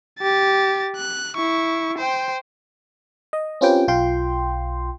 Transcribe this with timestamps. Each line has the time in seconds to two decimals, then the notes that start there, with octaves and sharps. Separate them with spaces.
0.19 G4 A6
0.96 F#6
1.36 E4 C#6
1.98 C5 G5
3.33 D#5
3.61 C4 C#4 F4 G4 B4 G5
3.88 B1 F4 G5 C6